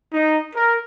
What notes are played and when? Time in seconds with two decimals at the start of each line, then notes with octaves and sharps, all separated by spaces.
0.13 D#4
0.54 A#4